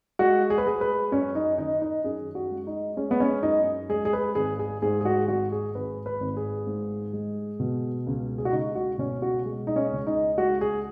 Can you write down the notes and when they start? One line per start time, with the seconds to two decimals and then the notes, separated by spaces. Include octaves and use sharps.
0.19 G#3 F#4
0.50 G#4
0.58 B4
0.66 G#3 G#4
0.81 B4
1.12 F#2 C#4
1.35 D#4
1.58 D#3 D#4
1.82 D#4
2.04 F#2 G#4
2.35 F#4
2.51 G#3
2.67 D#4
2.97 G#3 C#4
3.11 B3
3.20 C#4
3.43 F#2 D#4
3.89 G#3 G#4
4.05 G#4
4.13 B4
4.35 G#1 G#4
4.59 G#4
4.82 G#2 G#4
5.01 G#4
5.05 F#4
5.28 G#1 F#4
5.52 G#4
5.75 G#1 B4
6.06 B4
6.20 G#1
6.37 G#4
6.67 G#2
7.13 G#3
7.60 B2
8.07 C#2
8.38 G#4
8.45 F#4
8.52 C#2 D#4
8.75 F#4
8.98 B2 C#4
9.22 F#4
9.45 G#3
9.67 D#4
9.76 C#4
9.91 C#2
10.07 D#4
10.37 G#3 F#4
10.61 G#4